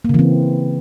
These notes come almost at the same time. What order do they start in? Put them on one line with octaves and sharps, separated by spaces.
A#3 C#3 E3 C4